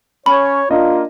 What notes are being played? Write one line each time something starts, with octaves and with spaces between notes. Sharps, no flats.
C#4 C#5 B5
A#3 D4 F4 D#5